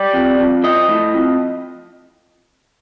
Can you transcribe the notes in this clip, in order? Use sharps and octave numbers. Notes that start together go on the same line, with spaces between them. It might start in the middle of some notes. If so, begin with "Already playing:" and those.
Already playing: G3 D5
F2
F2
F3 D#5
A2
F2